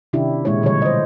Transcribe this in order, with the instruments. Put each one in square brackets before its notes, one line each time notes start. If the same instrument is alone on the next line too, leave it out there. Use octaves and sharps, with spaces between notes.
[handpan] C3 D#3 C#4 D4 E4 G4
A#2 G#3 E4 C#5
B2 D3 F3 G3 C#5
C5 D#5